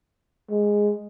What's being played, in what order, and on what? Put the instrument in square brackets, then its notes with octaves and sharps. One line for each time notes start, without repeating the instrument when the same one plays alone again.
[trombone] G#3